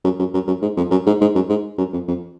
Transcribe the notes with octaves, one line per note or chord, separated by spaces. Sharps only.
F#2
F#2
F#2
F#2
G#2
F2
F#2
G#2
G#2
F#2
G#2
F#2
F2
F2